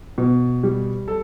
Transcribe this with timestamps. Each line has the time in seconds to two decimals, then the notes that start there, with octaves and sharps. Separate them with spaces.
0.18 B2
0.63 G3
1.08 A4